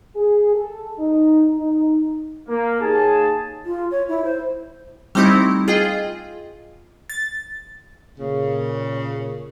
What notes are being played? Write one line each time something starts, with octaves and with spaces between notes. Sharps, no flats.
G#4
A4
D#4
D#4
A#3
D#2 G#4 A5
F4
C#5
E4
C5
G3 A3 C4 D#4 E4
F4 G#4 D#5 G5
A6
A#2 C#3